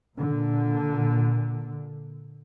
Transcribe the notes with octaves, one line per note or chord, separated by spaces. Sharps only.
A#2 D3